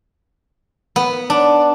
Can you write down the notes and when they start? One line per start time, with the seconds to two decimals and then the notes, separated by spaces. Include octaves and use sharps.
0.96 B3
1.30 D4